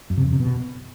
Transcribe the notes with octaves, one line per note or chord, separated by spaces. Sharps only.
F#2
C3
F2
C3
B2